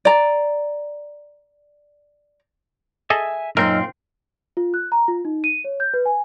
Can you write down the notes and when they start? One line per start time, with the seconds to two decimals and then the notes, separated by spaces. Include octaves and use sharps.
0.05 D5 A#5
3.10 G#4 A4 D#5 E5 G#5
3.57 F#2 A#2 C4 D#4 A#4 D#5 E6 F6
4.57 F4
4.74 F#6
4.92 A#5
5.08 F4
5.25 D#4
5.44 D#7
5.64 C#5
5.80 G6
5.94 B4
6.06 G#5